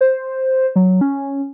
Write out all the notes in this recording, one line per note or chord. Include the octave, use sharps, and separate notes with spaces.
C5
F#3
C#4